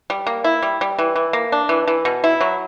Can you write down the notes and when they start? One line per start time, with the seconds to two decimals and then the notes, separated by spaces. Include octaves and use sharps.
0.10 G3
0.27 A#3
0.44 E4
0.63 G3
0.81 G3
0.98 E3
1.16 E3
1.33 A#3
1.52 D4
1.69 E3
1.88 E3
2.05 B2
2.24 E4
2.41 F#3